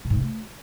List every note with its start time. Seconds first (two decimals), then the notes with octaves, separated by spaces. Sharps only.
0.05 B2
0.10 G#2
0.16 C3
0.21 A3